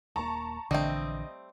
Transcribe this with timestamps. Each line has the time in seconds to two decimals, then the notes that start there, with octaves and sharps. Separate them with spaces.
0.16 D#1 A#3 A5 A#5 C#6
0.71 A#1 D3 E3 G3 A3 C4 D#5